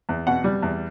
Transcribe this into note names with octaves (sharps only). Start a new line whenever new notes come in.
E2
B2 F#5
G3
E2